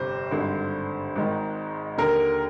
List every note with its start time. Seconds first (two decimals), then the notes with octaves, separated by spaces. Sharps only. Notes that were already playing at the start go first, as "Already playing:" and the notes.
Already playing: G1 F2 C3 C5
0.31 G#1 G2 D3
1.16 G#1 G#2 D#3
1.98 D#2 D3 A#4